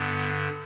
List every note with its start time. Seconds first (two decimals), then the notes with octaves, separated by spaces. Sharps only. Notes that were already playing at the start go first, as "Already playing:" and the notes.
Already playing: G2 D3 B3